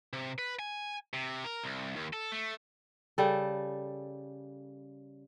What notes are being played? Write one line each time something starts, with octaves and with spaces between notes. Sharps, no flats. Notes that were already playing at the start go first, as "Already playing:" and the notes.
C3
B4
G#5
C3
A#4
C2
D#2
A4
A3
C#3 G3 A4